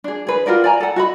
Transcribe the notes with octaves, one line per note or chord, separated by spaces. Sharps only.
D4 G#4
G#4 B4
F4 F#4 A#4 D5
D5 G#5 A#5
A4 F#5
F#4 D#5 B5